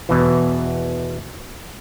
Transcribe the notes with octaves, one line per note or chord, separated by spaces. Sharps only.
E2 B2 E3